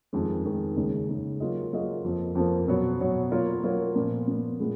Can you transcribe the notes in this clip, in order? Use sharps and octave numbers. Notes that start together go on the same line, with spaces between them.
F2 D#3 G#3
F2 D#3 G#3
D#2 C#3 G#3 D#4
D#2 C#3 G#3 D#4
F#3 A#3 F4 G#4 D#5
F#3 A#3 F4 G#4 D#5
F2 F3 A#3
F2 F3 A#3
B2 F#3 B3 F#4 C#5
B2 F#3 B3 F#4 C#5
F#3 A#3 F4 A#4 C#5
F#3 A#3 F4 A#4 C#5
A#2 F3 B3
A#2 F3 B3
A#2 G#3 B3